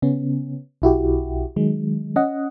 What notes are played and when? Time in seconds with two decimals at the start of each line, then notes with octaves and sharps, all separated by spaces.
0.02 C#3 B3 C#4
0.82 B1 E4 F#4 G4
1.56 D#3 F#3 G#3
2.16 C#4 D#5 F#5